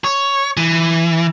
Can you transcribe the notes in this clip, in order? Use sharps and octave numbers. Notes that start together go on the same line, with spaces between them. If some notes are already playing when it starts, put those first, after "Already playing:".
C#5
E3